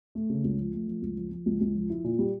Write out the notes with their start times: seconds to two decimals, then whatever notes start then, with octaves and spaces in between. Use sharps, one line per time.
0.15 A3
0.30 C#3
0.44 C#2
0.58 F3
0.73 A3
0.88 F3
1.02 C#2
1.17 F3
1.31 F3
1.46 C#2
1.61 C#2
1.75 F3
1.90 E4
2.04 A#2
2.19 G3